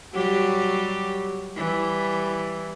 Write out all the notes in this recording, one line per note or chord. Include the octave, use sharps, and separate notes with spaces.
F#3 G3 G4
E3 G3 E4